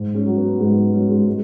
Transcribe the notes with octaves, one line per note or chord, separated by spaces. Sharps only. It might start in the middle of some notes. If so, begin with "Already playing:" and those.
Already playing: G#2
G#3 C#4
F#3
B3
G#2 G#3
B3
F#3 G#3 C#4
G#3
G#3